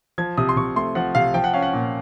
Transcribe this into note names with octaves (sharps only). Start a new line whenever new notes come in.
F3 G#6
C3 D#6
C6
C3 C#6
A3 C6
F3 F#5
C3 F5
F3 G5
F#5
C#4 F5
F#5
A#2